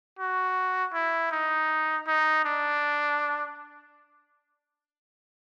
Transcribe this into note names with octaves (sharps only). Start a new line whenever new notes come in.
F#4
E4
D#4
D#4
D4